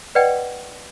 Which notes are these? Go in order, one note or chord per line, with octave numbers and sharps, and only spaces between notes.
B4 D5 D#5 F#5 G5